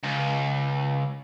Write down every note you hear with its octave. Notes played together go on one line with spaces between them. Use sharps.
C#2